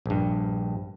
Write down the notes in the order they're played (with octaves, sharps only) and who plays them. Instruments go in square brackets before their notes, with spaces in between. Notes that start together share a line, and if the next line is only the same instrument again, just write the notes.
[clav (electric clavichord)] A#1 G2